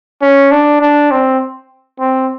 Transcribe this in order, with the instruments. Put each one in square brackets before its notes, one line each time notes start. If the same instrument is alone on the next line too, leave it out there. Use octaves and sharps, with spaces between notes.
[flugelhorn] C#4
D4
D4
C4
C4